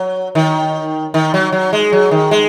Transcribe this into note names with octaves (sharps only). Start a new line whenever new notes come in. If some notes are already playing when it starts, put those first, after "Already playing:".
Already playing: F#3
D#3
D#3
F#3
F#3
G#3
F#3
D#3
G#3